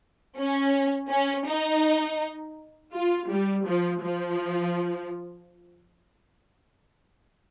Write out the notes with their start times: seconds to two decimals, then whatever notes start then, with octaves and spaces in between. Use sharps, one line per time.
0.37 C#4
1.09 C#4
1.46 D#4
2.92 F4
3.28 G3
3.65 F3
4.01 F3